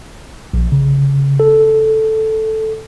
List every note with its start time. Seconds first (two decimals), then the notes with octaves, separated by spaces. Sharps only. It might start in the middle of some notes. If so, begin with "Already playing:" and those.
0.54 A#1
0.72 C#3
1.40 A4